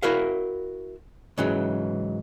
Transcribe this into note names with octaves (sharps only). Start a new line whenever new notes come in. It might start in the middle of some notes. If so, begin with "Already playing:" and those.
E4 F#4 A#4 E5 F5
G#2 C#3 E3 F#3